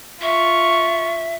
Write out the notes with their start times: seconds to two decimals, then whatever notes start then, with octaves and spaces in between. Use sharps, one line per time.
0.22 F4 E5 C#6